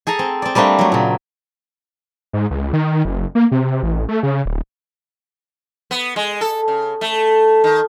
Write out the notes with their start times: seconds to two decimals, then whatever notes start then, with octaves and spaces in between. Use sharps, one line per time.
0.07 G#4 A4 G#5 A#5
0.19 C4
0.42 C4 D5
0.55 G3 A3 A#3 C4 D4
0.79 F#3 A3
0.92 A#2 C#3
2.33 G#2
2.51 C#2
2.73 D#3
3.05 F#1
3.35 A#3
3.52 C3
3.83 A1
4.09 A3
4.23 C#3
4.45 D1
5.91 B3
6.16 G#3
6.41 A4
6.68 C#3
7.01 A3
7.64 D#3